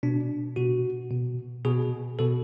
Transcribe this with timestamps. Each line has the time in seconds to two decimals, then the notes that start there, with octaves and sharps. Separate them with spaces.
0.03 B2 D4
0.56 B2 F#4
1.11 B2
1.65 B2 G#4
2.19 B2 A4